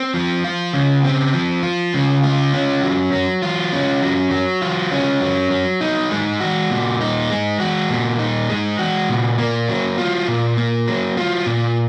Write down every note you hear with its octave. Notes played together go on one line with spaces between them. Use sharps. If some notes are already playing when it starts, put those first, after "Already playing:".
Already playing: C4
F3
F4
C#3
C4
F3
F4
C#3
F4
C#4
F#3
F#3
F4
C#4
F#3
F#3
F4
C#4
F#3
F#3
D#4
G#3
F#4
A#2
D#4
G#3
F#4
A#2
D#4
G#3
F#4
A#2
A#3
F#3
F4
A#2
A#3
F#3
F4
A#2